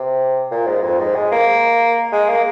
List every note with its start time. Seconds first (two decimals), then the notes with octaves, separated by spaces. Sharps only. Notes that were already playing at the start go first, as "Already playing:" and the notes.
Already playing: C3
0.51 A#2
0.67 G#2
0.83 F2
0.99 G#2
1.16 G#3
1.32 A#3
2.12 G#3
2.29 A#3